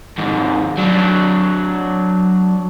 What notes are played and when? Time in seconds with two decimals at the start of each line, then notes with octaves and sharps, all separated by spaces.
0.18 D#2 G#2
0.78 F#3 D4